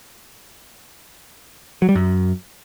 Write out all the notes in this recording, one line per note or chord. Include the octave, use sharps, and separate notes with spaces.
F#3
G3
F#2